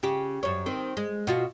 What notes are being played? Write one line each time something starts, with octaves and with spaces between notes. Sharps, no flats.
C#3 G4
F#2 C#5
D#3 C4
G#3
B2 F4 F#4